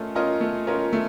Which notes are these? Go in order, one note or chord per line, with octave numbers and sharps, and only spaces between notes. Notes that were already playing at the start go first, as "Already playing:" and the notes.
Already playing: A3 C#4 F4 A#4 D#5
C#4 F4 A#4 D#5
A3
C#4 F4 A#4 D#5
A3